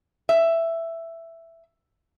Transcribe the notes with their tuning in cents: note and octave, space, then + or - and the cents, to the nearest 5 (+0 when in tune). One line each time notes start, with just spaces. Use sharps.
E5 +10